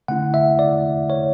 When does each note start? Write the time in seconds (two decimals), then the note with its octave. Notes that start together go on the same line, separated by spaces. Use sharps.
0.08 D3 A3 C#4 E4 F#5
0.34 E5
0.59 D5
1.10 C#5